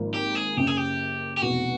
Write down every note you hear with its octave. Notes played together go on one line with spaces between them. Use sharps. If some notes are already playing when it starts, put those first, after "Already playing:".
Already playing: G#1 G#2 F3 A#3
G4
G#4
F#1 F#2 C#3 G4
G#4
G4
G4
F1 E2 B2 F#4